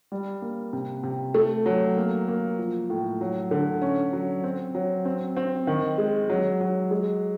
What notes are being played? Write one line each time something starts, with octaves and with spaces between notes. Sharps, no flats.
G3
A#3
C3
C3
A3
F#3
A#3
A#3
F3
A2
F#3
D3
C#4
F#3
C4
F#3
C4
C4
D#3
G#3
F#3
F#3
G#3